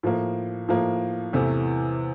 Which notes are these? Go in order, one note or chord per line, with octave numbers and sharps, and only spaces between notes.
A2 F3 A#3
A2 F3 A#3
E2 C3 E3 A3